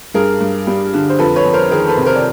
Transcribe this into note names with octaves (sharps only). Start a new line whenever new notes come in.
G2 G#4 A#4
G2
G3
D3
C5
F2 A4 B4
B4 C#5
F2
A#4 C5
D#3 G#4 A#4
A4 B4
C3
A#4 C5
D5